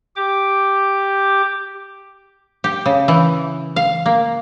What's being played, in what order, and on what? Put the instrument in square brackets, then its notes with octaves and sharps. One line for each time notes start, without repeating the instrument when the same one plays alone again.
[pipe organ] G4 D6
[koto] G4
C#3
E3
F5
A#3